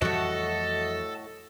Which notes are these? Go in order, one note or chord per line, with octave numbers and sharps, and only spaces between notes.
F2 A2 E3 G3 F#4 A4 D#5